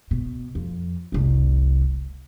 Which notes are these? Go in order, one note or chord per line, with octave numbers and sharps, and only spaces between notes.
B2
F2
F1 C2